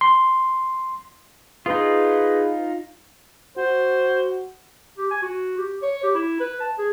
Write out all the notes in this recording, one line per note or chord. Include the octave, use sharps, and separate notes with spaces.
C6
D#4 F4 G#4 B4
F#4 C5
G4
G#5
F#4
G4
C#5
G4
E4
B4
A5
G#4